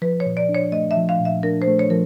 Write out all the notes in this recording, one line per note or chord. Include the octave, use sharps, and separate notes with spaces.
F3 B4
C#5
A#2
D5
D4
C#5
A3 D#5
E5
F3
F5
A#2 E5
D4 A#4
C5
A3
C#5
F3 A#4